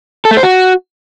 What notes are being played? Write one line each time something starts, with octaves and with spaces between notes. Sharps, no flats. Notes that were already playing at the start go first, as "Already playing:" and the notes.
A4
A3
C5
F#4